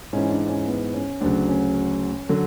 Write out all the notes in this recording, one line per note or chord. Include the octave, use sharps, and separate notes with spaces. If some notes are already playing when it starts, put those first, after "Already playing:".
G#2 E3 C#4
D4
C#4
B3
C#4
D2 C#3 F#3 D4
C#4
D3 F#3